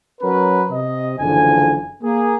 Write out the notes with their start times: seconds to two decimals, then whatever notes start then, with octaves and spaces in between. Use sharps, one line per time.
0.21 F#3 C#4 A#4 B4
0.71 C3 D#5
1.19 F#1 D3 E3 F3 G#5
2.03 A#3 G#4